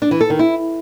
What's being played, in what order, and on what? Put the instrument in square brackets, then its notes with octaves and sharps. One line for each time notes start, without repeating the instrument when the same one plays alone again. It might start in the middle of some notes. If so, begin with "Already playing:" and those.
[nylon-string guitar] D4
E3
A4
D#3
E4